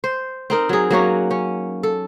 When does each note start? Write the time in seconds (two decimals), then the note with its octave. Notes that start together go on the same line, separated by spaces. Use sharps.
0.04 C5
0.50 C4 D#4 A#4
0.69 F#3 G#4
0.90 F#3 A#3 C#4 F#4
1.31 C#4
1.83 A4